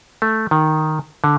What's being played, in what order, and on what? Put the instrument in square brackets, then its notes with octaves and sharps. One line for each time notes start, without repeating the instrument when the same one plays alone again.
[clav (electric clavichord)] A3
D#3
D3